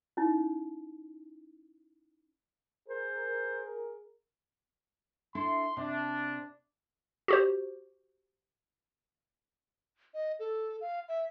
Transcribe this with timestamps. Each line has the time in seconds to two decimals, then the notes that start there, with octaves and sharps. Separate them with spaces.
0.17 C#4 D#4 E4
2.88 G#4 A#4 C5
5.35 D4 E4 A4 C6
5.77 C3 D4
7.28 F#4 G4 C5
10.14 D#5
10.39 A4
10.81 F5
11.09 E5